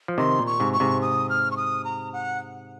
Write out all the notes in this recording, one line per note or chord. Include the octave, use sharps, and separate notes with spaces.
F3
C3 D#3 C6
A#2
C#6
G#2 C3
C#6
G#2 C3
D#6
F6
C#6
D#6
A#5
F#5